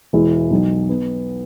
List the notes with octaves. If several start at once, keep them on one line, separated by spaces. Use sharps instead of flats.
E1 E2 E3 G#3 E4
B1 B2 F#3
B3